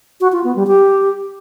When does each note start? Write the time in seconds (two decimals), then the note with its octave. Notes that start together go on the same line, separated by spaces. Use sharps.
0.21 F#4
0.32 F4
0.44 B3
0.56 G3
0.67 G4